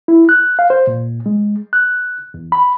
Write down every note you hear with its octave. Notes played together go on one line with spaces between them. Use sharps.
E4
F#6
F5
C5
A#2
G#3
F#6
E2
B5